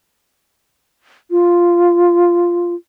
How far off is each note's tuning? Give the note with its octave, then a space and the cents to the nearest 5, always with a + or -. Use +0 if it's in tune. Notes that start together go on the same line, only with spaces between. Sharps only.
F4 -5